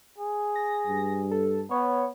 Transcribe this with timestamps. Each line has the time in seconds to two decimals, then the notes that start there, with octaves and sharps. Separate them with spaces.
0.18 G#4
0.55 A#6
0.87 G2
1.31 A4
1.71 B3 C#5